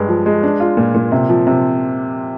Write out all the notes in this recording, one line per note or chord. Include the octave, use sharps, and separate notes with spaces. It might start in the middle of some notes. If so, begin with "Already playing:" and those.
Already playing: G2 G#3
F3
G#3
D4
F4
A#2
A#2
C3
F3
C3